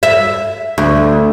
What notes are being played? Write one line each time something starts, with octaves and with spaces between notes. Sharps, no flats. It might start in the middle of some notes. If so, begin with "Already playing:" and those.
E5
D2